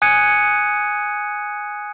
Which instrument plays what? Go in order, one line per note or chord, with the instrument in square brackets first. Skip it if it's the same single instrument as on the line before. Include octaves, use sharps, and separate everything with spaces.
[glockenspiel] G#5 D#6 F#6 G#6 C#7 D#7